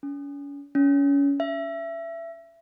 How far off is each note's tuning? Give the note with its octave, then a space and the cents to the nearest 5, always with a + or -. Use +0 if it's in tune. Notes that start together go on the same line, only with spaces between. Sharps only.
C#4 +40
C#4 +25
E5 +20